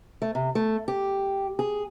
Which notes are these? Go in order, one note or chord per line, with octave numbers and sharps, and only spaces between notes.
A3
C3
A3
G4
G#4